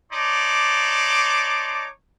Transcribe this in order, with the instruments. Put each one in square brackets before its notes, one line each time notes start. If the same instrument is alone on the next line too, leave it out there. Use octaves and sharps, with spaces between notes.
[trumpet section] D#4 C#5 D5 A5 C6 D6